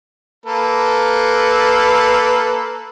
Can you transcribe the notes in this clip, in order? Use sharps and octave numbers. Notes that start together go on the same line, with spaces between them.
A#3 A4 B4